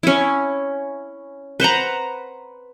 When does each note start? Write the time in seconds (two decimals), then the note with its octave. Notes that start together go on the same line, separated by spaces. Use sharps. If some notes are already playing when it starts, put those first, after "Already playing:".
0.03 C#4 E4
1.60 B4 C5 F#5 A#5